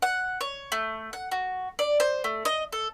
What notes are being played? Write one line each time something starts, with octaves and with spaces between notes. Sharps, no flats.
F#5
C#5
A3
F#5
F#4
D5
C5
A3
D#5
A4